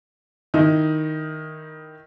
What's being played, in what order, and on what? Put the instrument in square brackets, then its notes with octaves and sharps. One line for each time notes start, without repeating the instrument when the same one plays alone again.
[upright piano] D#3 D#4 E4